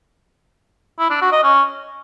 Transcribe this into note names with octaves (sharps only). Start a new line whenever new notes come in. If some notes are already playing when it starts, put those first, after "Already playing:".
E4
D4
F#4
D#5
C#4